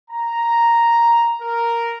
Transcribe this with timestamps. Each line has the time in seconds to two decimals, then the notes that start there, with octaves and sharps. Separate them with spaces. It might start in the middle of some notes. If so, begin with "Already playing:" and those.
0.11 A#5
1.42 A#4